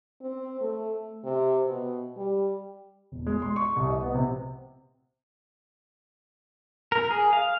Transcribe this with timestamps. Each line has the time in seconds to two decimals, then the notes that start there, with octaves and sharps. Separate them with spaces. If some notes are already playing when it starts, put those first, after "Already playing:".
0.21 C4
0.61 A3
1.24 C3
1.67 B2
2.17 G3
3.12 E1
3.27 G#3
3.42 C6
3.56 C#6
3.76 C2
3.90 D#5
4.02 B3
4.15 C3
6.92 A#4
7.11 G#4
7.33 F5